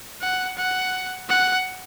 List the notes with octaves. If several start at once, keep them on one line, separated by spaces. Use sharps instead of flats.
F#5
F#5
F#5